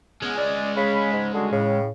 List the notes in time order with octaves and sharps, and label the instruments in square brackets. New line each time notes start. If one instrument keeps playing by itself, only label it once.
[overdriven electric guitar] G#3 C#4 [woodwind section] B3 G#5
[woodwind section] D5
[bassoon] C#3 [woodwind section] B5
[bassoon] G#2
[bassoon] D3 [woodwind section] G3 F#4 G#4
[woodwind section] A2 [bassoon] C#3